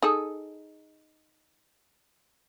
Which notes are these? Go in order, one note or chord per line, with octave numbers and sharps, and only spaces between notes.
D#4 G#4 A4